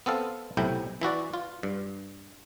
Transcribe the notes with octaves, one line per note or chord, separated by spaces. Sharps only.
B3 C4 A4 F5
B1 A2 C3 E4 G5
E3 E4 F#4 D5
F4
G2